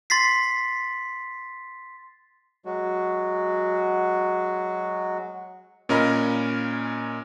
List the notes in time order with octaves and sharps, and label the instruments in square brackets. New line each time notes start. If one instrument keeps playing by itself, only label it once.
[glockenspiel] C6 A6 B6 C7
[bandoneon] F#3 G#3 F#4
[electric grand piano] A#2 C#4 A#4 D#5 A#5 B5